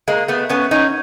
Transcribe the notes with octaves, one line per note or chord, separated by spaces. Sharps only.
G#3 A#3
A3 B3
B3 C#4
C#4 D#4